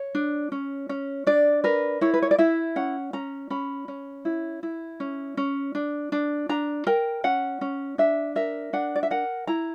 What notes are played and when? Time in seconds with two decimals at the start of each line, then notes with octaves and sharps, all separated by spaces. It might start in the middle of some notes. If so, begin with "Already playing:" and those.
Already playing: C#5
0.15 D4
0.52 C#4
0.89 C#4
1.27 D4 D5
1.64 A#4 B4
2.01 E4 C#5
2.14 B4
2.22 C#5
2.31 D5
2.38 E4 E5
2.76 C#4 F#5
3.13 C#4 A#5
3.50 C#4 B5
3.88 C#4
4.25 E4
4.63 E4
5.00 C#4
5.37 C#4
5.75 D4
6.12 D4
6.49 D4 A#5
6.87 A#4 G5
7.24 C#4 F#5
7.61 C#4
7.98 D4 E5
8.36 A#4 E5
8.73 D4 F#5
8.96 D5
9.03 E5
9.11 A#4 F#5
9.47 E4 A#5